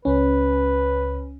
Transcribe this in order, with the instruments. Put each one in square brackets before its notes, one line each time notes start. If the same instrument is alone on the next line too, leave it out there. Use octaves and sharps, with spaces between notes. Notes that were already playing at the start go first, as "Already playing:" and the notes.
[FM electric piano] C#2 C#4 [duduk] B4